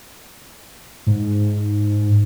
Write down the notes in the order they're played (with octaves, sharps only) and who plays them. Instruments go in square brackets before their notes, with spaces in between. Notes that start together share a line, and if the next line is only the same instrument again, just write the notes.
[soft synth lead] G#2